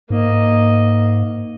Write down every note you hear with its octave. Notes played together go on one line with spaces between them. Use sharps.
G#2 A#3 D#5